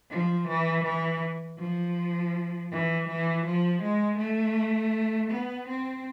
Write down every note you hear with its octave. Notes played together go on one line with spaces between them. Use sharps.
F3
E3
E3
F3
E3
E3
F3
G#3
A3
B3
C4